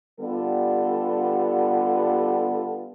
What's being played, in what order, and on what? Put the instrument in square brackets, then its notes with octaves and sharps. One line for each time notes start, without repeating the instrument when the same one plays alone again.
[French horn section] D3 G3 B3 F4 G4 A4